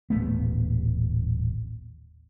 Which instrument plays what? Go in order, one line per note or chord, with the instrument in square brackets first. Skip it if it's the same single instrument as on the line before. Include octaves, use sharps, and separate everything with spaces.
[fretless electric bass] D#1 A1 A3 B3